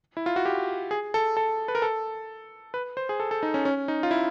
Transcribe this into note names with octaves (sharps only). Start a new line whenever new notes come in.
E4
F4
F#4
G4
G#4
A4
A4
B4
A#4
A4
B4
C5
G#4
A4
A4
D#4
C#4
C#4
D#4
F4
E4